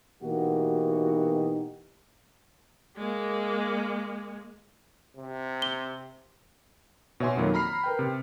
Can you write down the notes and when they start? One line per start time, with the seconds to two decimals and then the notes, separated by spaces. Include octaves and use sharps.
0.23 B2 E3 A#3 D#4 F#4 G4
2.97 G#3 A#3
5.16 C3
5.62 G7
7.20 B2 C#5 E5 G#5 C6
7.37 F2 D#3 F#3 A#3
7.54 A#5 B5 F6 C7
7.84 A#4 B4 G5
7.99 C3